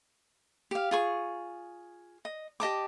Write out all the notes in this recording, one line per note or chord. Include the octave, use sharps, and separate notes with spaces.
G4 F5
F4 G#4 C#6
D#5
G4 D#5 A5 D6